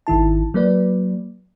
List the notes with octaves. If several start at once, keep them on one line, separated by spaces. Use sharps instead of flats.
G#1 D#3 E4 A5
F#3 A#3 B4 D5